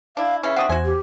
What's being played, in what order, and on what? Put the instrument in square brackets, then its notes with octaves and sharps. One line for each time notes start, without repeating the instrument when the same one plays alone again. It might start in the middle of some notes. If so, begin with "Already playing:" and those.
[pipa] D4 E4 [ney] F5
[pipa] C#3 E3 C#4 [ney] E5
[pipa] C4 D4 F#4 [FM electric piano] F#5 D#6
[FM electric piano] E2 C5 [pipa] F#4 G#5
[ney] G4